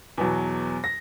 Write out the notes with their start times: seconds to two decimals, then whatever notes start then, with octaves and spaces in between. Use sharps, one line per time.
0.18 E2 B2 F#3
0.84 A#6